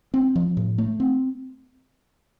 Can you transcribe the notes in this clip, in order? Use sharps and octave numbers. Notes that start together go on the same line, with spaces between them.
C4
F3
A2
A3
C4